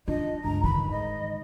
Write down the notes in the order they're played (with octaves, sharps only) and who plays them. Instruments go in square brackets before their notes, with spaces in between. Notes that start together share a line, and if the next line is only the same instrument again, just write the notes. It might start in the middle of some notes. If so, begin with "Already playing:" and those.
[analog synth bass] D4 [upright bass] F4 [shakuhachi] D#5
[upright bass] C#2 [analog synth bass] G2 [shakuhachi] A#5
[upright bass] D#3 [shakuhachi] B5
[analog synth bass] G#2 [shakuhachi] D#5